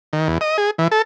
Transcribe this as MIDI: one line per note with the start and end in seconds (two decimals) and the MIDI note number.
0.13 0.27 51
0.28 0.38 40
0.41 0.57 75
0.58 0.71 68
0.78 0.88 52
0.92 1.02 69